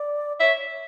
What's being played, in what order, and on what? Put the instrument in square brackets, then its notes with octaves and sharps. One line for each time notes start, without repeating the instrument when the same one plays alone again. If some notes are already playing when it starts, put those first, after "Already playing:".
Already playing: [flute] D5
[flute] C#5 [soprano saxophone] E5